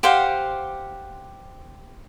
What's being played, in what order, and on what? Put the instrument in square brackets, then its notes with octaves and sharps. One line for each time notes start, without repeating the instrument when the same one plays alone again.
[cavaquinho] G4 C5 F5 F#5